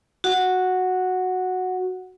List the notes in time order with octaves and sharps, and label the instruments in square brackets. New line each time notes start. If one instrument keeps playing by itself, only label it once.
[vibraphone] F#4 F#5